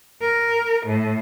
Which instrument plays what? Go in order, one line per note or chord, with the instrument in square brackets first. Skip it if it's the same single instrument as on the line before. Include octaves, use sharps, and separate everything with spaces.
[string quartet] A#4
A2